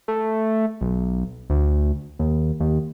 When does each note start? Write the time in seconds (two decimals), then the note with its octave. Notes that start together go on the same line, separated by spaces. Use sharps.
0.08 A3
0.81 B1
1.50 D2
2.19 D#2
2.60 D#2